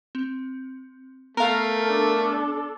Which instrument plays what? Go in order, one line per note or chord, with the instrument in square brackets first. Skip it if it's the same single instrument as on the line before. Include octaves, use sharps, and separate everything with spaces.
[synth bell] C4
[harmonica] A3 [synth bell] B3 [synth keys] A#4 F5
[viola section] D4 A4